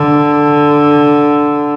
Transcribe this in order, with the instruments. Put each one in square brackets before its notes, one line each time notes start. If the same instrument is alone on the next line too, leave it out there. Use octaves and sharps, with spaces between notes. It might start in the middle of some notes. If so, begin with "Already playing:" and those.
Already playing: [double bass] D3